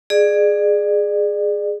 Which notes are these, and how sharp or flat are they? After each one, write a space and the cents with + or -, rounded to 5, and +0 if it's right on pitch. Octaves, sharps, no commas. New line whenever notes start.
G#4 +0 D5 +30